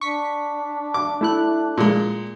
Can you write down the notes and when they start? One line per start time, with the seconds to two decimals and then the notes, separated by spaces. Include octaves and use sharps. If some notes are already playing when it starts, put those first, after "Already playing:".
0.01 D4 C#6 B6
0.94 D6
1.21 A3 E4 F#6
1.78 A#2 G#3